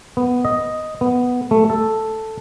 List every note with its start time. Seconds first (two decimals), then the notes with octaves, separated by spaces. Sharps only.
0.17 B3
0.45 D#5
1.01 B3
1.51 A3
1.70 A4